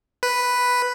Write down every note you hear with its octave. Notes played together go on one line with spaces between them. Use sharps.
B4